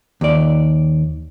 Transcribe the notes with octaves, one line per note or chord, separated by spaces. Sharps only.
D#2 D5